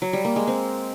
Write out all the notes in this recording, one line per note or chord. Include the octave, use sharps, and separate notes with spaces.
F#3
G3
A#3
G#3
C4